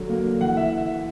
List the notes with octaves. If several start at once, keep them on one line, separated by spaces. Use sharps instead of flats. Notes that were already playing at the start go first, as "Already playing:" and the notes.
Already playing: D3 F#3
A#3
D3
E3 F#5
E5